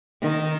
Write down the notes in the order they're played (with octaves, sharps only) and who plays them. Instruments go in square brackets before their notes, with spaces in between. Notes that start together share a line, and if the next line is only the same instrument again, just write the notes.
[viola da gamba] D#3